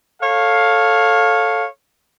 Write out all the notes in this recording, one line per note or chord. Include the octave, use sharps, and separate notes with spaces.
A4 C#5 F5